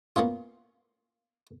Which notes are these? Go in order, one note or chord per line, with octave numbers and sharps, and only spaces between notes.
A#3 B3 C#4 F4